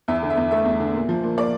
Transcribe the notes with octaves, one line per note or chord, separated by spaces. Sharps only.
E2 E5
D3
E5
E2
A3 E5
E2
D3
A#2
F3
A#2
A#3 D5